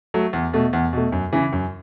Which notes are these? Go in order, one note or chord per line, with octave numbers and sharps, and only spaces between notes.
F#3 A3
E2
B2 A3
E2
B2 A3
F#2
C#3 E3
F#2